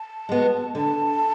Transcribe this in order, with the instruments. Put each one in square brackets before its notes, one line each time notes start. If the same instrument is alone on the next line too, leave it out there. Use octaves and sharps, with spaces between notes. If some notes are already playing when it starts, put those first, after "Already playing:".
Already playing: [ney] A5
[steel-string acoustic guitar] G#3 B3 F#4
[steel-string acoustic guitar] D3 [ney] A5